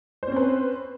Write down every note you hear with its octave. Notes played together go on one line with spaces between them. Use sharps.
C4 C#4 B4 C5